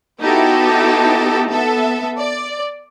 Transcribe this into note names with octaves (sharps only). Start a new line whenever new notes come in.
B3 D#4 E4 F#4 G4 A4
B3 A4 E5
D5